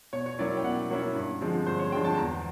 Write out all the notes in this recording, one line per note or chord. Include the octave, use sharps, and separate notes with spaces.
B2 C#5
C#5
F#3 A#3 C#4 E4 D5
G5
B2 F#5
F#3 A#3 C#4 E4
G2
D3 F3 G#3 C4
G2 C5
C#5
D3 F3 G#3 C4 G5
A5
E2 A#5